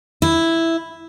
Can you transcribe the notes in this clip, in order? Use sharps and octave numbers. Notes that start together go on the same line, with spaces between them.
E4